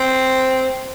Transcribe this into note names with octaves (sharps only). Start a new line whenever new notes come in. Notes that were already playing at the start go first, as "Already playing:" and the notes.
Already playing: C4